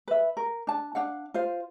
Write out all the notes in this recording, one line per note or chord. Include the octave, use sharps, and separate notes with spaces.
B4 E5
A#4
D4 A5
D4 F5 F#5
F4 C5 F5